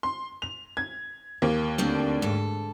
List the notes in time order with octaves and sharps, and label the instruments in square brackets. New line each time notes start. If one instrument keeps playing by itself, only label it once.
[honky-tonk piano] C6
F7
G#6
D#2 A#3
[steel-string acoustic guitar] D2 C4 D4
G#2 A4